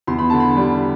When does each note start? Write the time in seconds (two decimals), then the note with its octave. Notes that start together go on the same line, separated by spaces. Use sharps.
0.07 E2 C6
0.19 B5
0.30 D3 A5
0.40 B5
0.57 G3